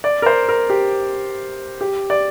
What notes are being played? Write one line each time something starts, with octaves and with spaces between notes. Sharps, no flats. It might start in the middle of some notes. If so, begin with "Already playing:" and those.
D5
A#4
C5
A#4
G4
G4
D5